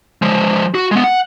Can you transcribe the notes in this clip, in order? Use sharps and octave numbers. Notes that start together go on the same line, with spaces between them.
F3 G#3
F#4
G#3 B3
F#5